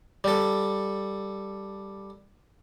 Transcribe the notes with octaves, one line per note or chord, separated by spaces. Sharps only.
G3 A4